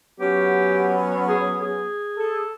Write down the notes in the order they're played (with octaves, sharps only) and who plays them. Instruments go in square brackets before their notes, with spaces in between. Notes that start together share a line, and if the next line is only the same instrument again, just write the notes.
[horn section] F#3 B3 C#4 [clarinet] G4
[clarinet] G#4
G#4
[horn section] A4